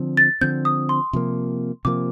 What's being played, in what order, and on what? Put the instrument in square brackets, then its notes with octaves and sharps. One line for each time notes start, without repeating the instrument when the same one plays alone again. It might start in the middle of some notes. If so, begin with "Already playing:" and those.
Already playing: [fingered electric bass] D3 F3 C4
[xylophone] A6
[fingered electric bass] D3 F3 C4 [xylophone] G6
[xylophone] D#6
C6
[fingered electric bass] C3 F3 A#3
[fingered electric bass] C3 F3 A#3 [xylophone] D6